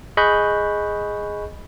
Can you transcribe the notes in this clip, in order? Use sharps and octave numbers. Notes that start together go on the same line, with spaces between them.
G#4 D#5 B5 C#6 F#6 G6